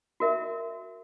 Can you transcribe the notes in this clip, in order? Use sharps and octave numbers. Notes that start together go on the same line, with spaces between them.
F#4 A#4 E5